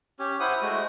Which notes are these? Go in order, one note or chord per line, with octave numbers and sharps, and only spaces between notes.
C#4 G4
E4 C5 F#5 D#6
G#3 A3 F#4